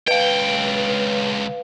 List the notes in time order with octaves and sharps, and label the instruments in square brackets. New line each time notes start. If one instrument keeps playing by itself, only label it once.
[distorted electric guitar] C#2 G5 [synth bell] B4 F5